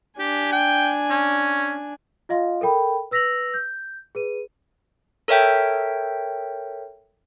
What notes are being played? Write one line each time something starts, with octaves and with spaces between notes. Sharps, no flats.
D4 G4 G#5
G5
C#4
F4 D#5 F5 C6
A4 A#4 G5 B5
B4 E6 A#6 B6 F7 F#7
G6
G#4 B4 D#7
A4 A#4 C#5 E5 G5 G6